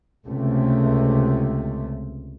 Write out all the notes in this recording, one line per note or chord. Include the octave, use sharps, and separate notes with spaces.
C#2 C3 A3